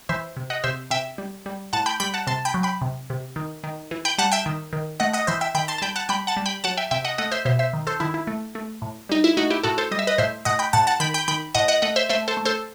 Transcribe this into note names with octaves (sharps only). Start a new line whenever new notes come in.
E3 C5 E5
C3
D#5 F#5
C3 C5 E5
C3 E5 G5
G3
G3
A2 F#5 A5
G5 B5
G3 G5 B5
F#5 A5
C3 A5 C6
G5 B5
F#3
G5 B5
C3
C3
D#3
D#3
E3
G5 B5
G3 F#5 A5
E5 G5
D#3
D#3
A3 D#5 F#5
D#5 F#5
E3 C5 E5
E5 G5
D#3 G5 B5
A5 C6
A5
G3 G5 B5
F#5 A5
G3 G5 B5
F#5 A5
G3
G5 B5
F#3 F#5 A5
E5 G5
C3 E5 G5
D#5 F#5
A3 D#5 F#5
C5 E5
B2 C5 E5
C5 E5
D#3
A4 C5
D#3 E4
E4
A3
A3
A2
G3 D#4
E4
A3 D#4 F#4
E4 G4
A2 F#4 A4
A4 C5
G3 D#5
E5
B4 D#5
A2 C5 E5
A2 D#5 F#5
G5 B5
A2 F#5 A5
F#5 A5
D#3 G5 B5
G5 B5
D#3 G5 B5
A2 D#5 F#5
D#5 F#5
A3 D#5 F#5
C5 E5
A3 C5 E5
A4 C5
A3
A4 C5